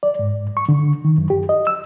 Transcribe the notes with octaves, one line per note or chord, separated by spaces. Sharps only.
D5
G#2
C#6
D3
D#3
F#2
G4
D#5
E6